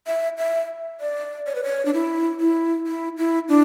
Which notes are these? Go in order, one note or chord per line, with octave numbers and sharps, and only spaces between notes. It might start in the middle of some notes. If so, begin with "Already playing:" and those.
E5
E5
D5
C#5
B4
C#5
D4
E4
E4
E4
E4
D4